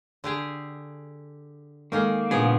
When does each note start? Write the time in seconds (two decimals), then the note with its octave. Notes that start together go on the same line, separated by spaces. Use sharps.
0.24 D3 G4 G#4
1.92 D#3 G#3 A#3 D#4 G#4 A4 F6
2.31 A#2 C#3 F3 B3 D4 D#4 G#4